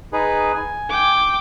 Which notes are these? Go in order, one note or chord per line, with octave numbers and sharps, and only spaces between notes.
D#4 G#4 B4
G#5
G5 D6